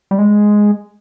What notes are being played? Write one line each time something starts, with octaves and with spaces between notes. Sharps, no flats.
G3
G#3